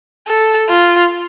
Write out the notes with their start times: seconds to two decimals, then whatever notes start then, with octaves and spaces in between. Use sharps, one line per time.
0.28 A4
0.69 F4